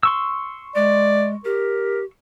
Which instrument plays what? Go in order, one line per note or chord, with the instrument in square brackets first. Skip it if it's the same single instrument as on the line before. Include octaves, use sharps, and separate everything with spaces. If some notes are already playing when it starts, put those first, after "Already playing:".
[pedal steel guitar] C6 C#6 E6
[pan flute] G#3 [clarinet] D5
[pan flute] G4 [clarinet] A#4